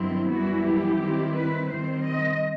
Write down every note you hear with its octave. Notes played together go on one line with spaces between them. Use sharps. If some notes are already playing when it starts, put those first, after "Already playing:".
Already playing: G2 D#3 F#3 C4 E4
F#2 E3 G3 B3 E4 F#4
G4
D#3 G3 C4 E4
B4
D#3 G3 C4 C5
D#5